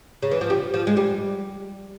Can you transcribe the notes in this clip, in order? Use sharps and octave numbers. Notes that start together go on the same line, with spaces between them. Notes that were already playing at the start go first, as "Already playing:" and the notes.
C#3
E3
F3
G3
F3
G#3
G3